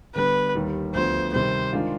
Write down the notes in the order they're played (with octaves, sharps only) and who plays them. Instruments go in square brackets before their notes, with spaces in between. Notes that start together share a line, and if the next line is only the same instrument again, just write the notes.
[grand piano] D3 G3 B3 D4 [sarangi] B4
[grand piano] D#2 D#3 G3
[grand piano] D2 D3 F3 B3 [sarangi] C5
[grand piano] C3 D#3 G3 [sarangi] C5
[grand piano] D#3 G#3 D4 F4